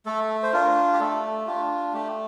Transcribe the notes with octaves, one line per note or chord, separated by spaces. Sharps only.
A3 A4
C5
D4 F4 A#4
G4
A3 A4
D4 F4 G4
A3 G4